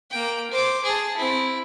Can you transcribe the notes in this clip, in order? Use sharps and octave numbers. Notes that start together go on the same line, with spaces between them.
A#3 G5
C5 D6
G#4 A5
C4 E4